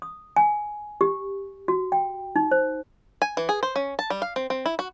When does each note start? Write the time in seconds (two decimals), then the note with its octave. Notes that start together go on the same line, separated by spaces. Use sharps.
0.02 D#6
0.36 G#5
1.01 G4
1.68 F#4
1.92 G5
2.36 D#4
2.51 C5
3.22 G#5
3.37 E3
3.49 G#4
3.63 C5
3.76 C#4
3.99 A5
4.10 G3
4.22 F5
4.36 C4
4.50 C4
4.66 E4
4.79 F#4